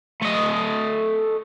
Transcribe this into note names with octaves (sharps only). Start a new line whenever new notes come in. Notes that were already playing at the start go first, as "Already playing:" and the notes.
A3 D#5